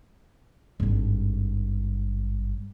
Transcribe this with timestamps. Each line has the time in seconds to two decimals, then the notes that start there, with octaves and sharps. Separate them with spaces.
0.80 G#1 G2